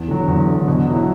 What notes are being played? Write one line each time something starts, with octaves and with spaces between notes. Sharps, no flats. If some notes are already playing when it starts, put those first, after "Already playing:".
Already playing: E2
D3 F#3
E2
D3 F#3
B2
F#3 B3 E4